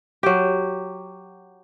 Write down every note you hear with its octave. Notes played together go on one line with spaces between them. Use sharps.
F#3 G4